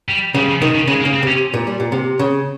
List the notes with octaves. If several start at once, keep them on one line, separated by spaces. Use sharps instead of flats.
G3
C#3 G3
F3
C3 D#3
C#3
C#3 G#3
A#3
C#3
C4
C3 C#4
A#2
G3
A#2
C3
C#3